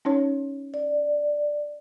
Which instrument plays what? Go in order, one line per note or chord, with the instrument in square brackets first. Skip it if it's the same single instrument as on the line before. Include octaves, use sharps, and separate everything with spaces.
[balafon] C#4 D#4 C#5
[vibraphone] D5